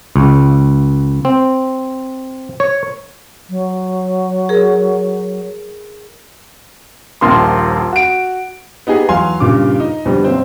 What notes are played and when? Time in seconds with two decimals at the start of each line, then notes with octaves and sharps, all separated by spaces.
0.16 C#2
1.25 C4
2.60 C#5
3.50 F#3
4.49 G#4 A#4
7.21 D#1 A#1 F3 A#3 C6
7.93 F#4 D7
8.87 B3 D#4 G4 G#4
9.09 E2 F#3 F5 G#5 C6
9.40 G2 A#2 C#3 D6
9.80 D#4
10.05 F2 B2 D3 G3
10.24 F#1 C4